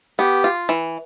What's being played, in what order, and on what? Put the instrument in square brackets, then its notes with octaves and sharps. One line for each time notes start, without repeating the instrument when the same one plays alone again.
[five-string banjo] B3 [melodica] G4
[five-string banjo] F4
E3